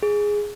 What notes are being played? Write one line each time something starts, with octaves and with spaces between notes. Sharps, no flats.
G#4